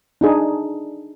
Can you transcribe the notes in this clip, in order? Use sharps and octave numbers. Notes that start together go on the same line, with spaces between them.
D4 D#4 G#4